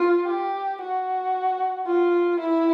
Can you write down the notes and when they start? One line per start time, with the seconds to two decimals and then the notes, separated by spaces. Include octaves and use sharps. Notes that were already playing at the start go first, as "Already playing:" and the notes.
Already playing: F4
0.27 G4
0.81 F#4
1.86 F4
2.40 E4